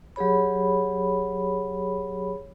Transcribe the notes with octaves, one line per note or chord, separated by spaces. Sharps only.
F#3 G4 G#4 C#5 B5